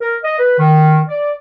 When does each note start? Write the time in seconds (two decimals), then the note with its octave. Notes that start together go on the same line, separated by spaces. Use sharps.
0.01 A#4
0.23 D#5
0.39 B4
0.59 D#3
1.08 D5